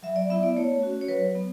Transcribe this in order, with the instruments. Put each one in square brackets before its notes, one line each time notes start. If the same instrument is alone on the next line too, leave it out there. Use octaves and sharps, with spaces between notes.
[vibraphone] F#3 E5
D5
B3 E4 E5
D5
A3 C#5
C#4 F#4
C#5
F#3 B4
B3